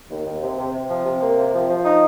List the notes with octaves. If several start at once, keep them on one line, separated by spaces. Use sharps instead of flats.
D#2
D#2
C3
C3
C3
F3
C3
A#3
C3
F3
F3
D#4